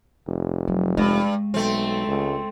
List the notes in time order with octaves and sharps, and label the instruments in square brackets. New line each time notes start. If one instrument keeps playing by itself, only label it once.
[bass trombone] F1
[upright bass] F#3
[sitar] G2 [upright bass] G#3
[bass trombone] B1 [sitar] A3 C4
[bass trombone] C#2